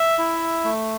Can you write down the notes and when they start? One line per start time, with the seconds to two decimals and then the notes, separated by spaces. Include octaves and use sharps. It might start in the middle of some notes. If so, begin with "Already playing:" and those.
Already playing: E5
0.18 E4
0.64 A3